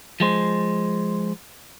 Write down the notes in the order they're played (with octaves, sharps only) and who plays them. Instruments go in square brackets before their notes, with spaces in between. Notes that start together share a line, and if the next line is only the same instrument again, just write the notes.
[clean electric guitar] F3 G#3 C5